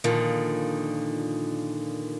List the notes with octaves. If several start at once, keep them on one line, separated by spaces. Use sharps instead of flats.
A#2 D3 D#3 F3